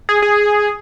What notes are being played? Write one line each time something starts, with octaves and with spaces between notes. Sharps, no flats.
G#4
G#4